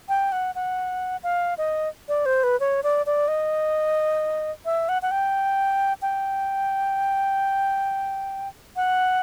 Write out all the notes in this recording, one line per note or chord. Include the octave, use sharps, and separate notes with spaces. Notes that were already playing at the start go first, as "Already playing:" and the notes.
G5
F#5
F#5
F5
D#5
D5
C5
B4
C#5
D5
D5
D#5
E5
F#5
F#5
G5
G5
F#5